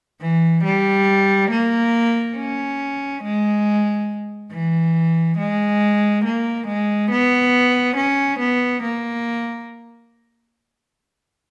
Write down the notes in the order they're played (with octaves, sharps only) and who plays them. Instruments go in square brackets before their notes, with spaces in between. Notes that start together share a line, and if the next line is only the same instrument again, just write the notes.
[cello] E3
G3
A#3
C#4
G#3
E3
G#3
A#3
G#3
B3
C#4
B3
A#3